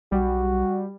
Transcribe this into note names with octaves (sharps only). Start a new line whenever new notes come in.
B1 G3 F#4